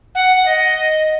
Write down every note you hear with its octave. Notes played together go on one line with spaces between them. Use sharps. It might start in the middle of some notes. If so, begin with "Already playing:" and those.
F#5
D#5